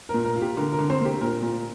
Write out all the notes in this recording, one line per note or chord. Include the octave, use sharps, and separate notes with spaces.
A#2 A#4
A#4
F4
G4
D3 A#4
A#4
D3
C4 C5
A#3 G4
A#2 A#4
A#2